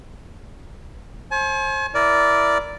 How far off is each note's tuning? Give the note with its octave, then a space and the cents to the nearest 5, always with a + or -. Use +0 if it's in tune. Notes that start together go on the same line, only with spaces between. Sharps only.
C5 +40 G#5 +40
E4 +0 A#4 +0 D5 -10